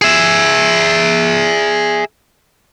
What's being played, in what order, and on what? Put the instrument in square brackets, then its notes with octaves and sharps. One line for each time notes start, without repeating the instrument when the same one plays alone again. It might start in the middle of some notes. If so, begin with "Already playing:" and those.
[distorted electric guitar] G#4 E5